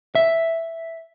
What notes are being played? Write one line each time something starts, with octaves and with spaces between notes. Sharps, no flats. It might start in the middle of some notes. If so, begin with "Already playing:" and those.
E5